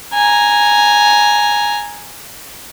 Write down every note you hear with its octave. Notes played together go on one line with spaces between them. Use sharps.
G#5 A#5